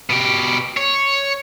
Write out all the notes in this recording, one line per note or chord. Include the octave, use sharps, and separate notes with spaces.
B2 G4
C#5